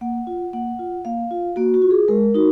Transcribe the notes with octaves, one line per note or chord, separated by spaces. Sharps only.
A#3 F#5
F4
A#3 F#5
F4
A#3 F5
F4
A#3 F#4
F#4
F4
G#4
G#3 A#4
D#4 F#4